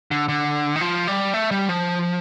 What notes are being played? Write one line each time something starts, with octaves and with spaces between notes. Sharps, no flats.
D3
D3
D#3
F3
G3
A3
G3
F3